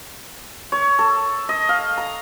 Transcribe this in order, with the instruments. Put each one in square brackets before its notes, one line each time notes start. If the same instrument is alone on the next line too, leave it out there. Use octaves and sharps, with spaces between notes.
[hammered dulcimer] C#5
A4
D#5
F5
A#5